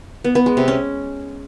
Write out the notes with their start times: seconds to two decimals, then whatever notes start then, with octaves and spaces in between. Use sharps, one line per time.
0.24 B3
0.35 B3
0.46 G#3
0.57 C3
0.68 C#4